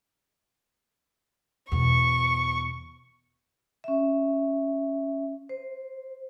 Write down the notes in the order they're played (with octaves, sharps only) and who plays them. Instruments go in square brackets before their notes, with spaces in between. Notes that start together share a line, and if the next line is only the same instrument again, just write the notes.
[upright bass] E2 B2 [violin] C#6
[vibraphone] C#4 E5
C5